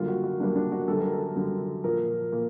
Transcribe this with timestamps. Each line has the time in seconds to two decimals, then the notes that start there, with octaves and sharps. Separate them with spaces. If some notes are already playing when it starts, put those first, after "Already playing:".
Already playing: F#2 D3 G3 A#3 F4
0.08 F#4
0.24 F#4
0.40 F#2 D3 G3 A#3 D4
0.56 D4
0.72 F#4
0.88 F#2 D3 G3 A4
1.00 A#4
1.13 A4
1.36 F#2 D3 G3
1.84 A#2 F3 A#3 A#4
2.32 A#2 F3 A#3